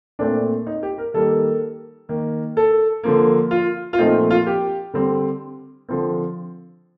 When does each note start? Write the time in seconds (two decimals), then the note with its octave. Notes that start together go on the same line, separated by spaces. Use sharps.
0.19 A#2 A3 C4 D4
0.67 D#4
0.83 G4
0.98 A#4
1.14 D#3 G3 A#3 A4
2.09 D#3 A#3
2.57 A4
3.03 D3 F3 A#3
3.51 F4
3.93 F4
3.98 A#2 F3 A3 C4 D#4
4.30 F4
4.46 G4
4.94 D3 G3 C4
5.89 D3 F3 C4